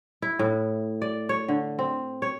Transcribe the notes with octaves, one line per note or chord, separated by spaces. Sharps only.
E4
A2
D5
C#5
D3
C4
C#5